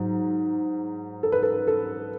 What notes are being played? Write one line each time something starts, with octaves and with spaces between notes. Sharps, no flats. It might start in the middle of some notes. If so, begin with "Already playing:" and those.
Already playing: G#2 F#3
A4
B4
A4
A4